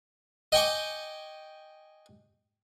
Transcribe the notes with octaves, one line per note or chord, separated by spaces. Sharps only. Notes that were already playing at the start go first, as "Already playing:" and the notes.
D#5 G5 G#5 C#6 D6